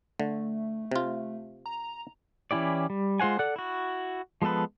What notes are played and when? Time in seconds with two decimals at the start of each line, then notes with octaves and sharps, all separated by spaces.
0.20 D3 A3
0.91 C3 F4
1.66 A#5
2.51 E3 C#4 E4 G4 D5
2.90 G3
3.20 G#3 F4 C5 F#5 G#5
3.39 A4 D5 F#5 F#6
3.56 E4 F#4
4.42 F3 G#3 B3 A4 B4